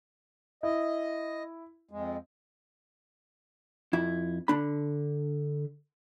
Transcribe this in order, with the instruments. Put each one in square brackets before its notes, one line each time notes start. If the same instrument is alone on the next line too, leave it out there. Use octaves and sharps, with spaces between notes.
[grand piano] E4 [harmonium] D#5
[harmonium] F2 G#3
[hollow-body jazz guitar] F2 E4
D3 D4 B5